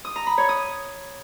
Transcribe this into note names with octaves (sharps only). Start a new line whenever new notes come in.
D#6
A#5
B5
C#5
D#6